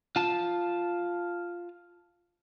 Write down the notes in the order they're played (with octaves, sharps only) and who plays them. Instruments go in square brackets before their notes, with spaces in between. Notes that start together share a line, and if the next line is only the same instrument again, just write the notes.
[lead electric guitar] F4 A5